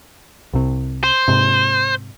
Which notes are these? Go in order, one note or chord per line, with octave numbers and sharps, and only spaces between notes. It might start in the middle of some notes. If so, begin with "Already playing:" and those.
C2 C3
C5
G#2 C3